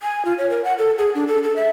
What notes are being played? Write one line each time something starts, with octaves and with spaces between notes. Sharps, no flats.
G#5
F4
C#5
A#4
F#5
A4
G#4
D4
A4
A4
E5